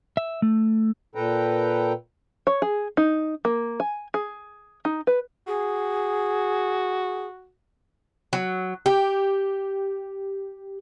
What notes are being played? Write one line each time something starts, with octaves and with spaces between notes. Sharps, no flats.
E5
A3
A#2 A4 B4 G5 A#5
C#5
G#4
D#4
A#3
G#5
G#4
D#4
B4
F#4 G#4
F#3
G4